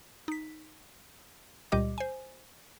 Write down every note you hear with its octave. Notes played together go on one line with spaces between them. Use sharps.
D#4 B6
C#2 A#2 G3 G4 D#5 D6
C5 G#5